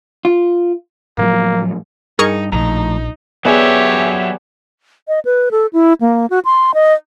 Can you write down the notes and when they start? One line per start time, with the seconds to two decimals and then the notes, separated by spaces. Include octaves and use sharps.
0.25 F4
1.18 A2 F3 F#3 A#3
2.19 G2 D#4 G#4 A#4 C#6
2.52 A#1 A2 F3 D#4 A#5
3.45 F#3 B3 G4 G#4 C#5 D5 E5 G#5
5.08 D#5
5.25 B4
5.51 A4
5.73 E4
6.01 A#3
6.30 F#4
6.45 C6
6.74 D#5